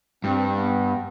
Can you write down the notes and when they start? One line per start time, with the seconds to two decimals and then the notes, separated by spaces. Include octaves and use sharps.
0.24 G2 C4
0.53 B3